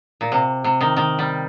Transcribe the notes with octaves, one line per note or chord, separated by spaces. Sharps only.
A#2
C3
C3
D#3
D#3
G3